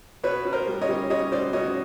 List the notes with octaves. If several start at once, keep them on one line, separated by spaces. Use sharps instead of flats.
B2 B4 C#5
B2
A#4 C5
G3
C#5 D#5
G3
G3 C#5 D#5
B2 C5 D5
B2 C#5 D#5